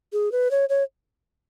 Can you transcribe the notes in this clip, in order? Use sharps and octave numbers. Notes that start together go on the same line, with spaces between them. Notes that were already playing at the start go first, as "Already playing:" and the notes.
G#4
B4
C#5
C#5